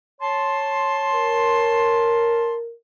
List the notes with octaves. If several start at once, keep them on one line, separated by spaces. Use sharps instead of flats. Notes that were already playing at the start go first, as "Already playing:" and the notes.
C#5 A5 C6
A#4